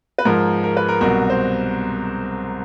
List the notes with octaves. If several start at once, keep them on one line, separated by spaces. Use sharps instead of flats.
B4
G#2 F3 G#3 A#4
A#4
B4
A#4
C2 B2 F#3 A#4
C5